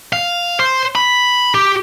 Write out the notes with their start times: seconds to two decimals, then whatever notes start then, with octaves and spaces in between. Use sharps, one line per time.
0.13 F5
0.60 C5
0.95 B5
1.55 G4